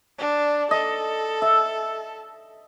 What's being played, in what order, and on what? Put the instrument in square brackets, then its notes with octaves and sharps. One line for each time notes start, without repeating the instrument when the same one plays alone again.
[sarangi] D4
[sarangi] A4 [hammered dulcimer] D#5
[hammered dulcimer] E5